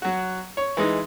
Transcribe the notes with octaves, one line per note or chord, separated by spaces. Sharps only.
F#3 F#4
C#5
E3 G#3 D#4